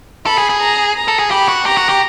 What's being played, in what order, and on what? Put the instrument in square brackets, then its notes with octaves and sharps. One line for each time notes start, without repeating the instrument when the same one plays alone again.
[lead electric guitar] A4 [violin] B5
[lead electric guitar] G#4
G#4
[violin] A#5
A#5
[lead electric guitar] A4
G#4
[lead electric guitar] G4 [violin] B5
[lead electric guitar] F#4
[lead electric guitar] G4 [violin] A#5
[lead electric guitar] F#4
G4